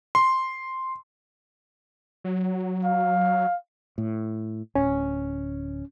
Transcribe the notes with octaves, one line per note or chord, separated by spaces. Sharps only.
C6
F#3
F5
A2
D1 C#4